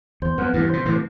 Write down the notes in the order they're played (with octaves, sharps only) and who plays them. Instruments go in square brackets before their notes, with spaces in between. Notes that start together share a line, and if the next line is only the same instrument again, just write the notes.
[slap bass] E2 [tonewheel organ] C5
[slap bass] F2 [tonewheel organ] B3
[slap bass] E2 G2 [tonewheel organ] E3
[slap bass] B2 [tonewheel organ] C5
[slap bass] A2 C3 [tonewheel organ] E3